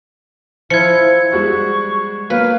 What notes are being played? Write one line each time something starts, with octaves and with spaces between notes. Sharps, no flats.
F3 E4 G#6 C#7
G3 G#3 F#4 C#6
F#3 A#3 B4 F5